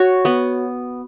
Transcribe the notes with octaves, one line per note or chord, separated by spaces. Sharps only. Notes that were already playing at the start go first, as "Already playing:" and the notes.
Already playing: F#4 C#5
B3